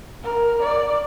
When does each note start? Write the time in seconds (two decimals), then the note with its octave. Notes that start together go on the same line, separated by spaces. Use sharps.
0.24 A#4
0.63 D5